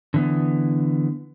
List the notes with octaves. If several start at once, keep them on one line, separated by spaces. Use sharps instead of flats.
D3 E3 B3